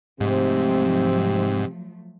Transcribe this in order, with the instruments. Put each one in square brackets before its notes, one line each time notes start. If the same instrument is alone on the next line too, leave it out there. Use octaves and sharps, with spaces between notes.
[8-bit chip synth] G#2 [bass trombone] C3 [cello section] F3 F#3 A3 [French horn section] C4